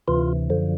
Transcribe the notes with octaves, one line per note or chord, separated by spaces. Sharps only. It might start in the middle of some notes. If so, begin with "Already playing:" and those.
D2 C3 E3 F4
F#2 D3 F3